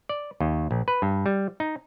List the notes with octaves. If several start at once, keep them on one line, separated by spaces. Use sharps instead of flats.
D5
D#2
A#1
B4
G2
G3
D#4